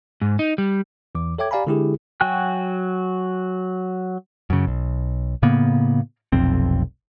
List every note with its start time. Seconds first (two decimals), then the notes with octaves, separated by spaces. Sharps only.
0.22 G#2
0.39 D#4
0.58 G3
1.15 E2 E3 D6
1.38 A4 C#5 E5 G5 D6 G#6
1.51 G4 D5 F5 G#5 A#5 B5
1.67 D3 G#3 E4 G4 G#4
2.21 F#3 F#4 G5 G#5 F#6
4.50 F#2 C#3
4.67 B1
5.42 A2 C#3 A#3 B3
6.32 F1 B1 F2 C4